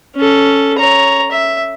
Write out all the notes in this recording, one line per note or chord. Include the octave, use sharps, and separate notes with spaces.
C#4 A4
C#5 A#5
E5